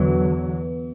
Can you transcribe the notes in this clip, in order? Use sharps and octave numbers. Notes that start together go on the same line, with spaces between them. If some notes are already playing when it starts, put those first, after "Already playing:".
Already playing: E2 D3 F#3 B3 B4